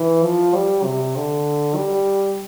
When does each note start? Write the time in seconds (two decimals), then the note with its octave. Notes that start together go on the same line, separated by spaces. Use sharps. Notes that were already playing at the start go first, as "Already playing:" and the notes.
Already playing: E3
0.24 F3
0.55 G3
0.84 C3
1.16 D3
1.76 G3